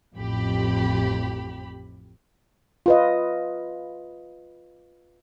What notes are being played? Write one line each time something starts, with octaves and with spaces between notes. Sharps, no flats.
A1 F2 G4 B5
F4 B4 D#5